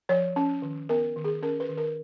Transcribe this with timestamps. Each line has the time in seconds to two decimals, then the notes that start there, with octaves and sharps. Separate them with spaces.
0.09 F3 C#5
0.36 C#4
0.62 D#3
0.89 B3 A#4
1.16 D#3
1.24 G#4
1.43 C#4 A#4
1.60 B4
1.69 D#3
1.77 A#4